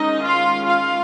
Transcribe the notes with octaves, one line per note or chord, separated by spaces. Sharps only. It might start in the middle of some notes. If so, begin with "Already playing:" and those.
Already playing: D#3 G#3 C#4 D#4 D#5
F4 F5
F4 F5